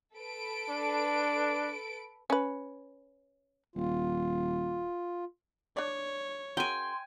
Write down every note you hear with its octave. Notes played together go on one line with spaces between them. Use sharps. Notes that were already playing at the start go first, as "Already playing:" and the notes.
A4 B4 D7
D4
C#4 B4
D#1 F4
D4 C#5 D5
C#3 F#4 A#4 G5 G#5 C6